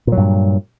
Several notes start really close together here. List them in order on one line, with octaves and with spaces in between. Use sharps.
A#2 F#3 G2